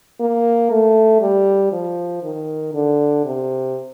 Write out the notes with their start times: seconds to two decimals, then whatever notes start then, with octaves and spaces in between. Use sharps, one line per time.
0.20 A#3
0.71 A3
1.21 G3
1.72 F3
2.23 D#3
2.74 D3
3.25 C3